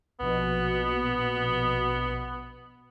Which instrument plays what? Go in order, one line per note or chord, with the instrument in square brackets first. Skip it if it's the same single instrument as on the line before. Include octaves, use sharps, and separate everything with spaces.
[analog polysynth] A#1 B2 [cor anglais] B3